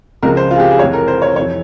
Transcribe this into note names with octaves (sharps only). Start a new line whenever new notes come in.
C#2 C#3 F3 G#3 A#4
C5
F4
G#4
G4
G#4
F1 F2 E3 G#3 C#5
A#4
C5
C#5
F1 E3 C#5